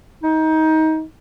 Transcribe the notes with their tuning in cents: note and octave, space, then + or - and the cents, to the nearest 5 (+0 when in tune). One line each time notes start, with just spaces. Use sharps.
D#4 +25